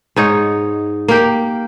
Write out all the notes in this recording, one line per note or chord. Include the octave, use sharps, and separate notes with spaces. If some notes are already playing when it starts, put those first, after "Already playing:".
G#2 D#4 C#5
A#3 G4